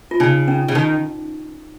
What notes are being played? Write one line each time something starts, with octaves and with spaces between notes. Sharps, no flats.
F4
C#3 D#4
C#4
C#3
D#3 D#4